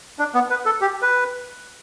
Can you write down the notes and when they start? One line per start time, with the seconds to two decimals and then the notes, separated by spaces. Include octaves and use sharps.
0.19 D4
0.34 B3
0.50 B4
0.66 A4
0.81 G4
1.02 B4